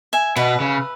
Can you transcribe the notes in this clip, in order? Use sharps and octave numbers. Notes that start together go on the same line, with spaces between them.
E5 G#5
B2 B4 E5
C#3